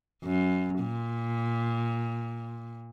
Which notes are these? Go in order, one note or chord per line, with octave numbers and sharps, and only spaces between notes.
F#2
A#2